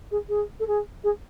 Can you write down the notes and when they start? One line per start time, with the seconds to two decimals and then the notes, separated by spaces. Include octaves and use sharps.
0.11 G#4
0.28 G#4
0.59 A4
0.67 G#4
1.03 G#4